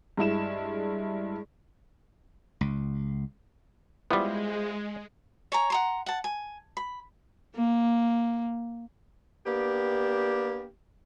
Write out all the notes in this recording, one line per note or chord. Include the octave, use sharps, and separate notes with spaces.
G2 G#3 E4 E7
C#2
G3 G#3 B3 E4 F4 C5
C#5 G#5 A#5
F#5 A#5 C6
F#5 A5
G#5
B5
A#3
A#3 B3 D4 G4